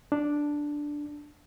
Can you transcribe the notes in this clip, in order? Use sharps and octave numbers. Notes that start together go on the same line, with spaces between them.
D4